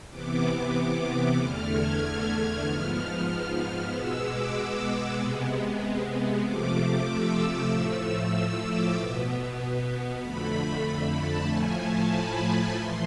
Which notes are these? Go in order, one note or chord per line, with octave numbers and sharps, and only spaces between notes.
C3 E3 B3 D6
D6
E2 D3 A3 F6
G#6
G#6
F6
G#2 F3 B3
B2 G#3 B3 E6
D6
C3 G#3 B3
C3 F3 A3 D6
E6
D6
A2 F3 A3 E6
E6
D6
B2 B3
F2 D3 A3 B5
B5
A5
A2 F3 A3 G#5
A5
B5
A2 E3 C6